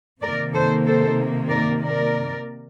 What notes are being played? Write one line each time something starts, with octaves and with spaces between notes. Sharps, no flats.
C3 D#3 A#3 A#4 D5
A4 C5
A4 C5
A#4 D5
A#4 D5